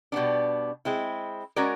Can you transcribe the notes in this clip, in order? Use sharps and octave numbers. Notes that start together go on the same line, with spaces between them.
B2 G3 B3 D4
G#3 C4 E4
G#3 C#4 F#4 A#4 D5